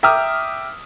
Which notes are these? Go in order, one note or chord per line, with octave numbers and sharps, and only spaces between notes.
E5 G5 A#5 D6 D#6 F6